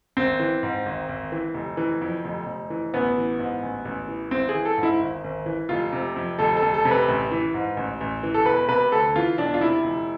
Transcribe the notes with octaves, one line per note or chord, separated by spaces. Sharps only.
G#1 C4
E3
G#2
G#1
G#1
E3
F1
E3
F2
F1
F1
E3
A1 B3
E3
G#2
A1
A1
E3
G#1 C4
G#4
E3
A4
G#2
E4
G#1
G#1
E3
F1 F4
C3
F2
F1 A4
A4
F1
A4
C3
B4
A1
E3
G#2
A1
A1
E3
A4
E1 B4
C3 B4
D2 A4
E3 F4
E1 D4
F4
C3 E4
F1